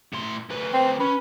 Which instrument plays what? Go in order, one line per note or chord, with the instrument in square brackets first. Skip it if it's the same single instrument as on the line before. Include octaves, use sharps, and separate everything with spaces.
[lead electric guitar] A2 C6
D2 B4
[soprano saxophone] C4
[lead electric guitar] C#4 [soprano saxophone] B4